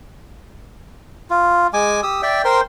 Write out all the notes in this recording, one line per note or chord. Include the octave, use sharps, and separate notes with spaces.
F4
G#3 G#5 D6
G4 D#6 E6
D5 E5 G5
A#4 C5 G5 C6